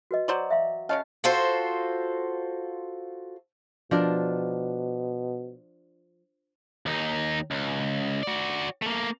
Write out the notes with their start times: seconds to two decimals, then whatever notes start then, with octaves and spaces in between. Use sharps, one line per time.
0.11 F#4 B4 D#5
0.28 F#3 C5 D5
0.50 E5 F5 C6
0.89 C#3 C#4 C#5 D#5 F5 A5
1.24 F4 F#4 A4 C5
3.91 B2 F3 D4 A#4
6.86 D#2 D#4
7.51 C#2
8.23 F#4 D5
8.82 A3 A#3